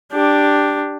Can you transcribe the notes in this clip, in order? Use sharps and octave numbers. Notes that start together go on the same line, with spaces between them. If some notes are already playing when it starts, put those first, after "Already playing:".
D4 G4